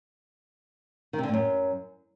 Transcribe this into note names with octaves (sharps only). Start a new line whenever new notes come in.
D#3
C3
D3
A2
F#2